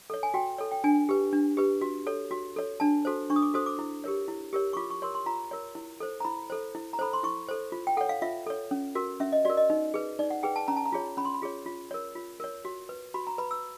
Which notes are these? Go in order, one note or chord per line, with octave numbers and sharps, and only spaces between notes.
A4 C#5
G#5
F#4 G5
A4 C#5
G5
D4 G#5
G4 B4
D4
G4 B4
F#4
A4 C#5
F#4
A4 C#5
D4 A5
F#4 A4 C5
D4 C#6
D#6
D6
F#4 A4 C5 D#6
D6
E4
G4 A#4 C#5
E4
G4 A#4 C#5
C#6
F4 D6
C#6
A#4 C#5 C6
C6
F4 A#5
A#4 C#5
E4
A4 C5
A#5
E4 B5
A4 C5
E4
A#5
A4 C5 B5
C6
E4 C#6
A4 C5
F4
G5
A4 C#5 F#5
F5
F4 E5
A4 C#5
C#4
F#4 A#4
C#4 E5
D#5
F#4 A#4 D5
D#5
D#4
G#4 B4
D#4 D5
F#5
G#4 B4 G5
A5
C#4 A#5
A5
A#5
F4 G#4 C#5
C#4 B5
C6
B5
F4 G#4 C#5
F4
A#4 C#5
F4
A#4 C#5
F#4
B4
F#4 B5
A#5
B4 B5
E6